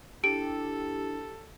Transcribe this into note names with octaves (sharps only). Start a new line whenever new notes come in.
D4 E4 G4 A4 D7